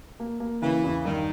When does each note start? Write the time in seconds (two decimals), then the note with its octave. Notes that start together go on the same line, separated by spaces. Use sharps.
0.20 A#3
0.40 A#3
0.62 C#3 E3
0.83 E2
1.05 G2 D#3